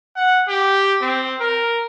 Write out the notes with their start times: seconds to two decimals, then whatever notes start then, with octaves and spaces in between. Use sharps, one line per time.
0.16 F#5
0.48 G4
1.01 C4
1.40 A#4